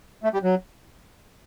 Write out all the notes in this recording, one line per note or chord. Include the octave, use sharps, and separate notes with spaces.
A3
G3
F#3